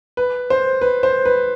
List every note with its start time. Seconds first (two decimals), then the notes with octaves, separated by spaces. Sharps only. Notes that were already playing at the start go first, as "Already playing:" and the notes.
0.17 B4
0.50 C5
0.81 B4
1.03 C5
1.25 B4